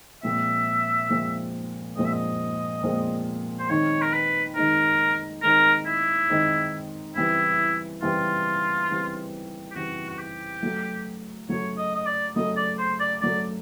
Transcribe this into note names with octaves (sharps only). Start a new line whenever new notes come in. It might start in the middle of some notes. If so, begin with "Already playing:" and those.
A#2 F3 G#3 C4 E5
A#2 F3 G#3 C4
A#2 F3 G#3 C4 D#5
E5
D#5
A#2 F3 G#3 C4
C5
D#3 G#3 C4 D#4 C#5
A#4
B4
D#3 G#3 C4 D#4 A#4
D#3 G#3 C4 D#4 A#4
E4
D#3 G#3 C4 D#4
C#3 E3 G3 C4 E4
C#3 E3 G3 C4 F4
C#3 E3 G3 C4
G4
C#3 E3 G3 C4 F#4
F#4
G4
C#3 F#3 A3
C#3 F#3 A3 C#5
D#5
D#5
D5
C#3 F#3 A3 D#5
D5
C5
D5
C#3 F#3 A3 D5